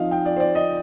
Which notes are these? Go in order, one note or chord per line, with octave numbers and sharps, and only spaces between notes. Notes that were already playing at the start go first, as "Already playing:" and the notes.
Already playing: F3 C4 D#4 D#5 F5
G5
D5
C5
D5
D#5